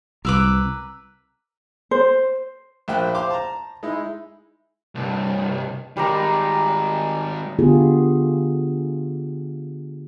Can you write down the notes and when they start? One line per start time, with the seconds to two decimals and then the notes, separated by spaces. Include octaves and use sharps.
0.25 C2 A#4 B4 D6 E6
1.91 C5
2.88 A#1 F3 E5 G5 F#6
3.15 C5 F5 C6 D6
3.30 A5 A#5
3.83 G#3 D#4 E4
4.95 C2 G2
5.97 D#3 G3 G#3 D5 A#5
7.59 D3 B3 F4 G4 G#4